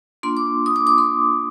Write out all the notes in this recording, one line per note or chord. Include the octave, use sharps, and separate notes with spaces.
A#3 D4 F4 C6
D6
D#6
D6
D6
C6